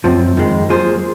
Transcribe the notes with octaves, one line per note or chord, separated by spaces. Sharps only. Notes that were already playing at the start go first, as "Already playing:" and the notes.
F#2 F3 C4
F2 D#3 G#3
F#3 A#3 F4 G#4 C5